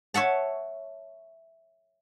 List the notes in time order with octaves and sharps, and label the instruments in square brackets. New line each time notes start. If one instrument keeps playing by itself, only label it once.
[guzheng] C#5 E5 F#5 A5